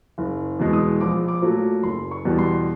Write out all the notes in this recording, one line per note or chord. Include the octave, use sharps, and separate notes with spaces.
F#1
E2 B2 G#3
D#6
A#1 D6
D6
A#2 F#3 A3
F#1 C6
C#6
E2 B2 G3
C6